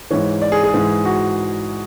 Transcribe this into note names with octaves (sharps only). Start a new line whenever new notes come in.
G#2 E3 C#5
D5
G#4
G#4
G#2 E3
F#4